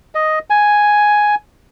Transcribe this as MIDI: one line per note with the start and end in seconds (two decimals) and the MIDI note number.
0.15 0.39 75
0.50 1.35 80